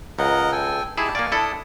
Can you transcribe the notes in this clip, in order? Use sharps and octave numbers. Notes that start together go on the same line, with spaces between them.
C#2 A#4 D#5 F#5
A4 G5 G#5
D#4 E4 G4 G#4 A5
A#3 D5 F5 G#5 C#6
D4 E4 A4 D#6